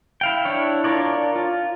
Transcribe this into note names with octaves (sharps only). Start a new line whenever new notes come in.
E4 F5 G5
D4 E4 C#5
D4 F4 A#4 C#5 D5
F4